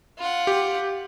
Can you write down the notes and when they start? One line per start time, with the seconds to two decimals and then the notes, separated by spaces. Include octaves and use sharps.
0.18 F4 F#5
0.47 G4